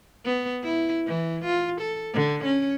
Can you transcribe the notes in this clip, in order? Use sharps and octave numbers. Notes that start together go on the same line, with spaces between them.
B3
E4
E3
F4
A4
D3
C#4